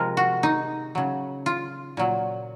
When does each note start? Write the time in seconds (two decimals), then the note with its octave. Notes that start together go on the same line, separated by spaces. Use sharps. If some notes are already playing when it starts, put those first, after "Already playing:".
Already playing: C3 F3 G#3 A#4
0.17 F#4
0.43 D#4
0.95 C#3 F#3
1.46 F4
1.97 A#2 F#3